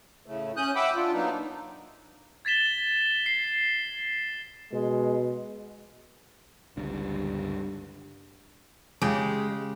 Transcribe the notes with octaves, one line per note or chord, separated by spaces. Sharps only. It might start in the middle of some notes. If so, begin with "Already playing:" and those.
A2 C#3 A3
C#4 D#6 F#6 G6
E5 F#5 G5 B5 D6 E6
D4 F4
F#3 A#3 B3 D4 D#4
G#6 A6 B6 E7 G7
C7
B2 G#3
G1 C#2 G2 D3
C#3 G#3 G4